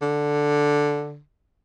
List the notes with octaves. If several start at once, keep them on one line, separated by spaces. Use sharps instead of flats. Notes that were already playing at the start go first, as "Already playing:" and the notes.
D3